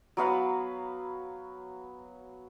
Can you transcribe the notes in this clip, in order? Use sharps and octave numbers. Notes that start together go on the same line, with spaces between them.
F#3 B3 F5 B5